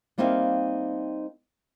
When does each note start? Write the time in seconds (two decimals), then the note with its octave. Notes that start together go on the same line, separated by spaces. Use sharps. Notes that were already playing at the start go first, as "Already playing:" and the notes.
0.18 G3 A#3 C4 D#4 E5 F5